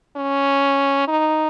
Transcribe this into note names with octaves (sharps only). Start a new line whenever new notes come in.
C#4
D#4